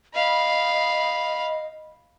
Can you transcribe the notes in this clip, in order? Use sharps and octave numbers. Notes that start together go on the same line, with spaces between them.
D#5 F5 B5